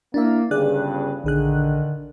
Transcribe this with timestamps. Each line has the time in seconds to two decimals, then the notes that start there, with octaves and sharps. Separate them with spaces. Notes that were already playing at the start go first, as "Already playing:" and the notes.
0.14 A#3 D4 E4 E5
0.51 G1 G2 C#3 G#4 D5 F#6
1.24 A#1 D3 D#3 G#4 F#6